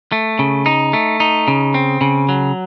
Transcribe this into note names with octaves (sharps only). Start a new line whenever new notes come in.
A3
C#3
D#4
A3
D#4
C#3
C4
C#3
F#3